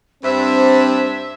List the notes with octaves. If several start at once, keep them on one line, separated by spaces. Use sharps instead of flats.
G2 C4 C5 E5